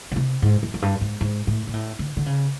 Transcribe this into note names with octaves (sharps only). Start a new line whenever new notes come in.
C#3
C3
G#2
F#2
F#2
G2
G#2
G#2
A2
A#2
A2
D3
D3
C#3